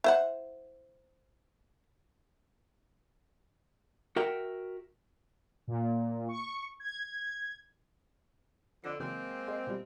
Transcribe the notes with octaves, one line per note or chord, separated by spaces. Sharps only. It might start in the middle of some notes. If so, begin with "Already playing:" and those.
E4 C5 F#5
F#4 A#4 E5 G5
A#2
C#6
G#6
F2 D3 A#6 C7
C#3 E3 F#3 G#3 A#3 C4
G#4 C5 D#5
B2 F3 G3